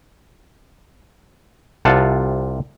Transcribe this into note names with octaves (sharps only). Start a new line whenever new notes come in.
C2 C3 F4 F#5 A5